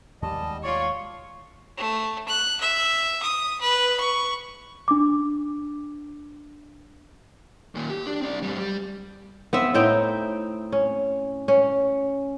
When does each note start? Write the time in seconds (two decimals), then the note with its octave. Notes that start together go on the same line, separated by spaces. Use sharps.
0.22 D#2 B2 G3 G#3 D#5 A5
0.63 F4 C#5 D5 C#6
1.77 A3
2.28 F#6
2.61 E5
3.23 D#6
3.61 B4
4.00 C#6
4.88 D4 D6
7.75 D#2 A#2
7.90 G4
8.07 D4
8.21 C4 D5
8.42 G#2 G3
8.58 G3
9.53 B3 C4 E5
9.74 A2 C4 D#4 G5
10.72 C#4
11.48 C#4